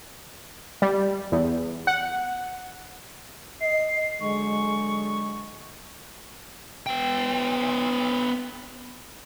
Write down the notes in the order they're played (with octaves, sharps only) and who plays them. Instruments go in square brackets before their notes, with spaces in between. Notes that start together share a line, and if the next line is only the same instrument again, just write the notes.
[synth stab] G3
E2
F#5
[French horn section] D#5 [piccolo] C7
[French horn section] D3 F#3 G#3 [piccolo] C#6
[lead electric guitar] B3 G5